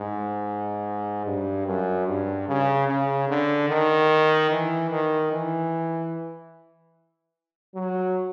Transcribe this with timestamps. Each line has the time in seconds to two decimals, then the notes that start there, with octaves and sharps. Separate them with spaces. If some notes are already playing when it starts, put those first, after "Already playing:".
Already playing: G#2
1.25 G2
1.66 F#2
2.06 G2
2.48 C#3
2.87 C#3
3.29 D3
3.69 D#3
4.50 E3
4.90 D#3
5.31 E3
7.75 F#3